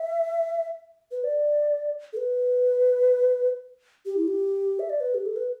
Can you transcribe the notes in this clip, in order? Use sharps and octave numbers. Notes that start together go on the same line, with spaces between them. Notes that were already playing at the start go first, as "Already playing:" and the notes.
Already playing: E5
B4
D5
A4
B4
G4
E4
G4
E5
D5
B4
G4
A4
B4